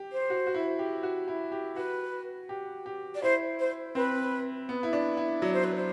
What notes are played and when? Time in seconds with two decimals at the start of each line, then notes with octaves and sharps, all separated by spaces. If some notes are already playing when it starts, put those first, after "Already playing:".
Already playing: G4
0.12 C5
0.30 F#4
0.47 F#4
0.54 E4
0.79 G4
1.03 F#4
1.28 E4
1.52 G4
1.76 F#4 B4
2.49 G4
2.86 G4
3.14 D5
3.22 E4 C5
3.59 C5
3.95 C4 B4
4.69 B3
4.83 E4
4.93 D4
5.17 E4
5.42 F#3 D5
5.53 C5
5.63 B4
5.75 C5